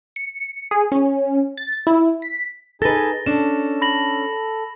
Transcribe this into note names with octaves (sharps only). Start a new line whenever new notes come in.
C#7
G#4
C#4
A6
E4
B6
D#4 G#4 A4 B4 G#5 A6 A#6 G7
C#4 D4 A4 E7
B5 A#6 F#7